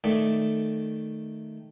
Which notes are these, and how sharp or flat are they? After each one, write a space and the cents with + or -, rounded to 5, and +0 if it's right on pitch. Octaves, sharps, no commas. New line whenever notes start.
D#3 +0 A3 +0 D5 +0